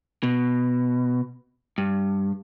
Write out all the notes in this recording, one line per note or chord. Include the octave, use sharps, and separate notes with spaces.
B2
G2